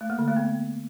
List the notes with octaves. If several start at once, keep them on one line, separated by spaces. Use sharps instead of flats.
A3
A#3
D3
A3
B3